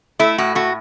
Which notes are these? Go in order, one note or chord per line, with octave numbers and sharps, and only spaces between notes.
A3 E4
A2 F#4
A3 F#4